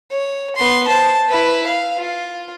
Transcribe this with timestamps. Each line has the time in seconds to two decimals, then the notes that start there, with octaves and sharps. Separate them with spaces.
0.11 C#5
0.56 B3 C6
0.87 C5 A5
1.28 E4 B4
1.66 F5
1.97 F4